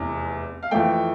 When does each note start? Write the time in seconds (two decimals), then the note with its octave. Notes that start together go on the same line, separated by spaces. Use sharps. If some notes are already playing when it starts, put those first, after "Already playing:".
Already playing: F1 E2 E3
0.63 F5
0.71 F2 E3 A3 G5